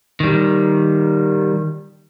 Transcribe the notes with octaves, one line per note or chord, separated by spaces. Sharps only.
D#3 G3